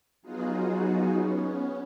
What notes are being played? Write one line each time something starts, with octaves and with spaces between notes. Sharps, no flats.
F#3 B3 D#4 F4 F#4 G#4
B3 C#4